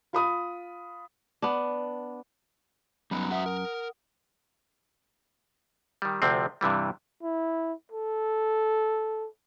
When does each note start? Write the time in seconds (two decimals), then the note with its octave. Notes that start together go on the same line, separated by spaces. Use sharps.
0.13 F4 B5 D#6
1.42 B3 D4
3.11 F#2 G3 B3 D#4 B5
3.31 F#4 B4 E5 F#5 D#6
3.46 A#4
6.02 D#3 G3
6.22 D2 C3 F3 C4
6.61 G2 C3 E3 G3
7.23 E4
7.92 A4